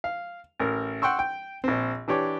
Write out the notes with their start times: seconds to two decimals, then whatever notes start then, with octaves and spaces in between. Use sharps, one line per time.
0.04 F5
0.60 A1 A#4
1.02 F#5 G5 C6 C#6 E6
1.19 G5
1.64 A#1 C4
2.08 E3 D4 G4 C#5 D6